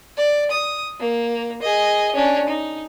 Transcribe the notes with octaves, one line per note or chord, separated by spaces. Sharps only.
D5
D#6
A#3
G#4 D#5
C#4 D4
D#4